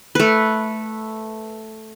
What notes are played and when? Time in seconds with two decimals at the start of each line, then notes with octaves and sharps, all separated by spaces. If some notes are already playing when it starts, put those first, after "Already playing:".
0.15 A3 B4